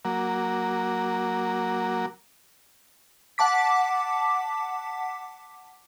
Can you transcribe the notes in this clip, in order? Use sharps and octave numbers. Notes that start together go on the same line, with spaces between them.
F#3 A#3
F#5 A5 D6 B6